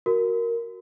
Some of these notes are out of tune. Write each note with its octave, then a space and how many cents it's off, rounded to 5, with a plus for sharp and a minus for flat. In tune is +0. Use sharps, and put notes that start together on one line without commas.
F#4 +0 A#4 +0